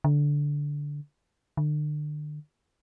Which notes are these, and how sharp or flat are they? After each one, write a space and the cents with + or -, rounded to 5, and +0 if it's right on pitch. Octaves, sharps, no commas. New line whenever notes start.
D3 -10
D3 +35